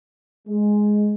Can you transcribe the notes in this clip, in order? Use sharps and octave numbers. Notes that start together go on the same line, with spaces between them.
G#3